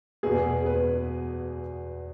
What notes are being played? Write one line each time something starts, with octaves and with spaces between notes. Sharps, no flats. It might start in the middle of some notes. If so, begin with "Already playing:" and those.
E2 B2 B3 G#4
B4